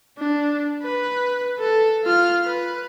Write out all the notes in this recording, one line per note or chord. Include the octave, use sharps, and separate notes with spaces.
D4
B4
A4
F4 F6
B4